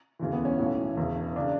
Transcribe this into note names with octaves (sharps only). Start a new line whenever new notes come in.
E1 D2 C#3 E3
B3
C#4
B1 A2 E3
E1 E2 C#3
C#3 D4